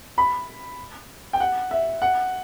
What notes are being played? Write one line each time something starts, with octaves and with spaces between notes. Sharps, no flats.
B5
G5
F#5
E5
F#5